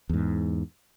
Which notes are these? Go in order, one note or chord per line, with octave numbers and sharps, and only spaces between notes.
E2 G#2